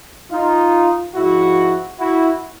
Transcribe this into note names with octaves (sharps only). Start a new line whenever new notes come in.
D#4 F4
G#2 F3 G#3 E4 F#4
E4 F#4